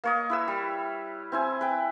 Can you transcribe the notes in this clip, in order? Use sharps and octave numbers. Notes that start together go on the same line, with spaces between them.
A#3 C#5 D#5
E4 B4 E6
G3
C4 E4 G#5
B4 G5